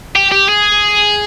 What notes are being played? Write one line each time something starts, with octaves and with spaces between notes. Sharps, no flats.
G4
G4
G#4